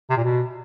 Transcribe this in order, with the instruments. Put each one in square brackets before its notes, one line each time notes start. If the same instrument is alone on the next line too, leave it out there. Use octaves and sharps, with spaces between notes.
[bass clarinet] C3
A#2
B2